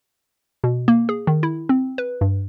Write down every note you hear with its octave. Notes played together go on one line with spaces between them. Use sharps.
B2
A#3
G#4
D#3
E4
C4
B4
G2